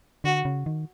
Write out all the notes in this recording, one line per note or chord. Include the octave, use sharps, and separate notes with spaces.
D3 F#4
C#3
D#3